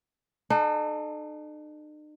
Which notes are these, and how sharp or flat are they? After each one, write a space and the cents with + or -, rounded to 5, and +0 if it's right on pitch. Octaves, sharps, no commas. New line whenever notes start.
D#4 -45 A4 -25